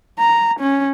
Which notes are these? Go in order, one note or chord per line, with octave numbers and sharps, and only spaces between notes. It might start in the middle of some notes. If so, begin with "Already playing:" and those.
A#5
C#4